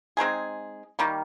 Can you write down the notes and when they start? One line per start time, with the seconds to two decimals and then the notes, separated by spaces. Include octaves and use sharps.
0.17 G#3 C4 D#4 G#4
0.99 D#3 G3 A#3